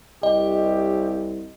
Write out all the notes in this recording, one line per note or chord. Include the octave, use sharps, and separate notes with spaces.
C2 G4 D#5